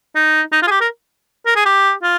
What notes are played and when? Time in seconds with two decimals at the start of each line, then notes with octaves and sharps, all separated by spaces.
0.15 D#4
0.52 D#4
0.62 F4
0.67 G#4
0.71 G4
0.81 A#4
1.46 A#4
1.56 G#4
1.66 G4
2.03 F4